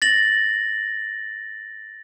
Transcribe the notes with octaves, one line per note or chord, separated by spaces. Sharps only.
A6 A#6 F#7